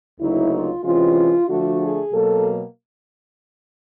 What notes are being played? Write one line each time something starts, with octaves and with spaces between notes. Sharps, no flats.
D2 C#3 F#3 A#3 D#4 E4
F4
C3 E3 G#3 C#4 F4
D3 F3 A3 D4 F#4
G#4
B2 F#3 A#3 A4